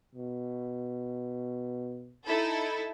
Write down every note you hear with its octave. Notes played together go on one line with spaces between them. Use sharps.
B2
D#4 E4 A4